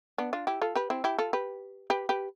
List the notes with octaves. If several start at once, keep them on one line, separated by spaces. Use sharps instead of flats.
B3 D4
D4 F4
E4 G4
F4 A4
G4 B4
C4 E4
E4 G4
F4 A4
G4 B4
G4 B4
G4 B4